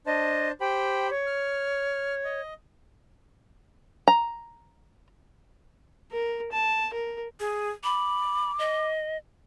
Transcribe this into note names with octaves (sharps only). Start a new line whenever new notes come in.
D4 C5 D#5 A5
G4 C5 G5 B5
C#5
F6
D#5
A#5
A#4
A5
A#4
G#4
B5 D6
D#5